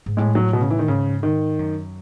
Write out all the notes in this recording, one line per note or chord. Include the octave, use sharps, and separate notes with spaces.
G#2
A2 G#3
F#3
B2
C#3
E3
D#3
G#2 C#3
D#3
F#2